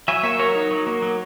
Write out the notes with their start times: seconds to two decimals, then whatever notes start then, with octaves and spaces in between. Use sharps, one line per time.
0.08 F#3 E5 G#5
0.23 A#3 C#5 E5
0.39 F#3 A#4 C#5
0.55 D#4
0.71 F#3
0.87 A#3
1.02 F#3